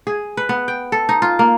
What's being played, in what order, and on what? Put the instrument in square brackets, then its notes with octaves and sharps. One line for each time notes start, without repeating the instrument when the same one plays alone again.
[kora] G#4
B4
B3
G5
A4
D#4
F4
A#3